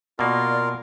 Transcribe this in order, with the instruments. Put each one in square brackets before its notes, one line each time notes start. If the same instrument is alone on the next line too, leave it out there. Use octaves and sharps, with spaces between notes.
[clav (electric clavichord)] B2 A#3 [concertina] F4 A#4 F5 [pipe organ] D5